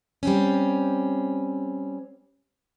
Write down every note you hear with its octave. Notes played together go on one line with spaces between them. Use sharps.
G3 C4 C#4